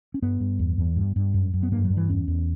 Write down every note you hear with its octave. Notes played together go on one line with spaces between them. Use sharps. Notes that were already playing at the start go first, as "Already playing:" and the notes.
C#4
G2 B3
G2
E2
E2
G2
G2
F#2
F#2
B3
G2 A#3
F#3
G2
E3
E2 C#4
E2